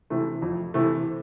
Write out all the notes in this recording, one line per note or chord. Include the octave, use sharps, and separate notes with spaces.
C3 E3 A3
F2
C3 E3 A3